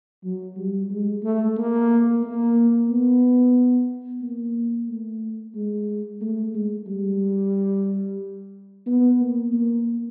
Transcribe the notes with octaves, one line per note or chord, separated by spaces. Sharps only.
F#3
G3
G#3
A3
A#3
A#3
B3
A#3
A3
G#3
A3
G#3
G3
B3
A#3
A#3